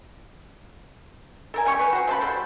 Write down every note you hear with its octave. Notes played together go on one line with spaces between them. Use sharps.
A4 A#4 G#5
C#3 G3 C#6
B4 G#5
F#4 C5
C#3 C5 A5 B5
G3 F#4 A4 C5